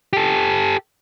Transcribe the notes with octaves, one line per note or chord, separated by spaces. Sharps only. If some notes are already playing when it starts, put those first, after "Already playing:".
G4 A4